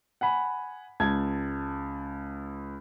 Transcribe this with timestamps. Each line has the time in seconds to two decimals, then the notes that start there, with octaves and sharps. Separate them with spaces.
0.21 F#5 G#5 B5
1.00 C#2 A5 G#6